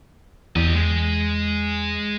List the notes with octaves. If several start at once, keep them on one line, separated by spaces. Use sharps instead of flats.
E2 G4 D#5
G#3